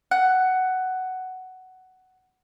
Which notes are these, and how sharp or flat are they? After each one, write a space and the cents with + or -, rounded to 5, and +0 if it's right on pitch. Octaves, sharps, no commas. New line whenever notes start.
F#5 +10